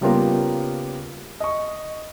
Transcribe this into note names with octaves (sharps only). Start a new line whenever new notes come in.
C#3 G3 A#3 B3 F4 A#4
D#5 C#6